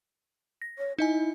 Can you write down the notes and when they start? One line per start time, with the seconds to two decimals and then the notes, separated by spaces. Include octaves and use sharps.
0.62 A#6
0.78 C#5
0.99 D#4 E4 D#5 G#5